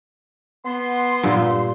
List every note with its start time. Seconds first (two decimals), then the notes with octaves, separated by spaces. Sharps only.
0.66 B3 C6
1.24 G2 A#2